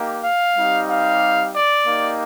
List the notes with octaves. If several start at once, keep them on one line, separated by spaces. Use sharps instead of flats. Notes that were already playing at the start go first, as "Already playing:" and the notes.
Already playing: A#3 D#4 G4
F5
G3 C4 D#4 G4
F5
D5
A#3 D#4 G4